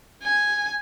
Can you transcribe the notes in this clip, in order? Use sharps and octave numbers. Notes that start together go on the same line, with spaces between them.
G#5